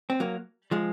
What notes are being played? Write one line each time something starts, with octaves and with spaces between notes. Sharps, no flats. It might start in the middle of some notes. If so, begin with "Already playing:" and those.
C4
F#3 A#3
F3 G#3